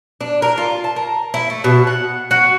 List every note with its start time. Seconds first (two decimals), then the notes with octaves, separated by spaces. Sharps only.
0.21 D4
0.42 A#4
0.58 F4
0.84 A5
0.96 A#4
1.34 E4
1.50 A3
1.64 B2
1.87 F#5
2.31 F#4